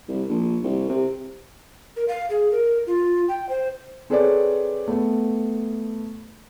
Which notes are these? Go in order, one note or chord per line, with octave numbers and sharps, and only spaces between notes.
C2
A#1
C2
C3
A#4
F5
G#4
A#4
F4
G5
C5
C4 G#4 A4 B4 C#5 D5
A3 B3